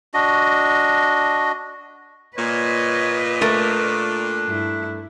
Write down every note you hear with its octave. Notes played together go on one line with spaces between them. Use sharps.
D4 F#4 D#5
A#2 B4 C#5 D#5
A3 D4 A#4
G2 E4